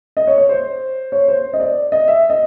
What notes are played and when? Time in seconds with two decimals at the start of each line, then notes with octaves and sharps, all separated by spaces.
0.17 D#5
0.27 C#5
0.38 C#5
0.49 C5
1.12 C#5
1.28 C5
1.54 D#5
1.60 D5
1.92 D#5
2.08 E5
2.30 D#5